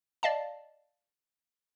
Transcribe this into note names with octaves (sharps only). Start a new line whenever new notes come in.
D5 D#5 F5 A5